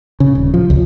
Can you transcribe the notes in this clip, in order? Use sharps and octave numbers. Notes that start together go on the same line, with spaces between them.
C#3
D#1
F3
C#2